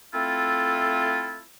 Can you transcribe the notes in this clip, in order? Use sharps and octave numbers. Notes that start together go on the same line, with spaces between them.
A3 C4 E4 F4 A4